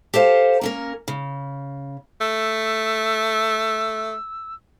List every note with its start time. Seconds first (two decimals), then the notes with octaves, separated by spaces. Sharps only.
0.14 G4 A4 C5 E5 F5
0.61 A#3 C#4 A#4
1.08 C#3
2.20 A3 E6